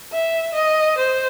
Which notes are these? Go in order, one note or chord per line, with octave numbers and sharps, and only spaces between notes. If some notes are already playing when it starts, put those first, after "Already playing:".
E5
D#5
C5